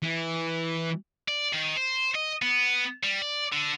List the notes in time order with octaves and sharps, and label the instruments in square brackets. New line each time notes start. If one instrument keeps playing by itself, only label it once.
[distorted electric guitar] E3
D5
D#3
C5
D#5
B3
G3
D5
D3